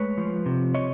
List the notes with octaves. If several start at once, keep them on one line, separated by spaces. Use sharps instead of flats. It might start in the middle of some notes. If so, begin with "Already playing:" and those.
Already playing: G#3 A3 B4 C#5
F3
C3
C#5 D#5